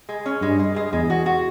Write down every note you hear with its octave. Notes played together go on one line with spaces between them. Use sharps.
G#3
C#4
G2 G#3
G#3
G#3
E2 G#3
F#4
F#4